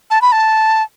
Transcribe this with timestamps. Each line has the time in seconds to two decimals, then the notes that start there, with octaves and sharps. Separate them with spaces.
0.11 A5
0.22 B5
0.32 A5